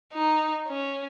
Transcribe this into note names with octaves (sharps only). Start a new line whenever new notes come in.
D#4
C#4